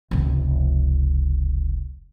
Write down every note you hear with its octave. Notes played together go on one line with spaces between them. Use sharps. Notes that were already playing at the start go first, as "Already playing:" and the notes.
F1 C#2